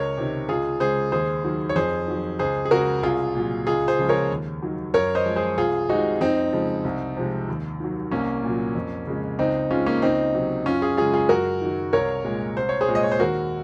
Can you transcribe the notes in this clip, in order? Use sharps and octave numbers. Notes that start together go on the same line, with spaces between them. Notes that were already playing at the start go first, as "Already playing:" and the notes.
Already playing: C#2 A#4 C#5
C3 D#3
C#2 F4 G#4
C#3 G#3 G#4 C5
D#2 G#4 C5
D#3 F#3
C#5
F2 G#4 C5
D#3 F#3
C#2 G#4 C5
G#4
C#3 G#3 F#4 A#4
C2 F4 G#4
A#2 F#3
C#2 F4 G#4
G#4 C5
C#3 F3 G#3
A#4 C#5
D#2
D#3 F#3
F#2 A#4 C#5
C5 D#5
F3 G#3
G#4 C5
C2 F4 G#4
C3 D#3 G#3 D#4 F#4
F2 C4 D#4
C#3 F3 G#3
C2
C3 F3 G#3
D#2
D#3 F#3
C2 A#3 C#4
A#2 F#3
F2
C#3 G#3
C#2 C4 D#4
C#3 G#3 C#4 F4
A#3 C#4
C#2 C4 D#4
C3 F#3
F#2 C#4 F4
F4 G#4
C#3 G#3 F4 G#4
F4 G#4
F#2 F#4 A#4
D#3 F#3
C2 A#4 C#5
A#2 G#3
C2 C5
C#5
G#4 C5
A#2 G#3
D#5
C#5
C5
D#2 F#4 A#4